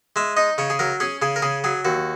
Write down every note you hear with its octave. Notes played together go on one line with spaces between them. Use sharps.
G#3 E5
D#4 D#5
C#3 C#5
G#4
F#3 A#4
C#4 G#4
C#3 G#4
A#4
C#3 G#4
F#3 G#4
D#2 F#4